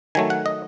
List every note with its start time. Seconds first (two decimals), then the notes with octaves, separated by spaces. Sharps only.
0.15 D#3 F#3 A3 G#5
0.30 F#5
0.46 D#5